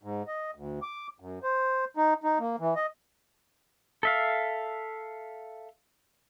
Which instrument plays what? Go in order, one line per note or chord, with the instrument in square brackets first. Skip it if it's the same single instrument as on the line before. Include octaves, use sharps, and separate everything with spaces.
[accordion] G#2
D#5
D2
D6
F#2
C5
D#4
D#4
A#3
E3
D#5
[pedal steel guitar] A4 E5 F5